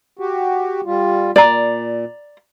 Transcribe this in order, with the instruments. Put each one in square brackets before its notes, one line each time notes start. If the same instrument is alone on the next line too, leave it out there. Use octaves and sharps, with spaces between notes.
[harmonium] F#4 G4
G3 F4
[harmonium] A#2 [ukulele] D5 A#5